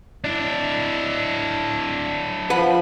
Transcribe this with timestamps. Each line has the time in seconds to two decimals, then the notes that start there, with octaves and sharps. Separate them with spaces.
0.24 D4 E4
2.50 F3 B4 F#5